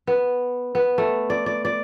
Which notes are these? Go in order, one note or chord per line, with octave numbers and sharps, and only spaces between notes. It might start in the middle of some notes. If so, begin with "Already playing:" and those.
B3
B3
A3
D5
D5
D5